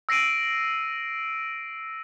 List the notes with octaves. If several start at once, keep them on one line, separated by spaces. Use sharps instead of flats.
E6 A#6 C7 D7 D#7